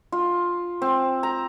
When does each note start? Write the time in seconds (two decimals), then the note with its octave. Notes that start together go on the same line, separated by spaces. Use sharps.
0.12 F4
0.82 C4
1.23 A#5